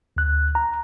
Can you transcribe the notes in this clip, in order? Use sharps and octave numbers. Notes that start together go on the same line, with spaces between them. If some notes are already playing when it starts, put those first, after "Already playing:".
D2 F#6
A#5